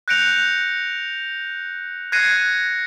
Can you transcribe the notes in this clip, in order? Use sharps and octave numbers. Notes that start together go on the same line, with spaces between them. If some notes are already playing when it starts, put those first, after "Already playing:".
F#6 G6 A#6 C#7 D7 F7
F#6 G#6 A#6 C7 C#7 D#7